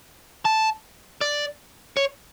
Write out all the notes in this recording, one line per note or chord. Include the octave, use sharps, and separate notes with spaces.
A5
D5
C#5